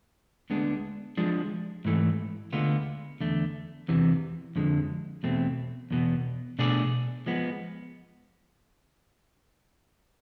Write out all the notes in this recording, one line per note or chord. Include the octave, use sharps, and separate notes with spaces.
D2 D3 G#3 B3 D4
F3 G#3 D4
G#2 E3 A3
D2 D3 G#3 B3 F4
E2 D3 A3
E2 C3 E3
F2 D3 G#3
E2 B2 A3 C4
E2 B2 B3
B2 A3 D4 G#4 D5
F3 G#3 B3